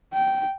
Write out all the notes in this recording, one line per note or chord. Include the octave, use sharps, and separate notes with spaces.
G5